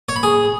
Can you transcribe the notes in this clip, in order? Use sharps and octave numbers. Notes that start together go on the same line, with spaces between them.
C#5
B5
G#4